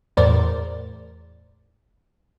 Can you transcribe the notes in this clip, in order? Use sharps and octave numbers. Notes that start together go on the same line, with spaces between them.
E2 A2 A#4 C5 D5 A6